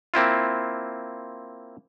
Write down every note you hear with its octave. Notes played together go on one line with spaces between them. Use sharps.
A#3 C4 E4 F4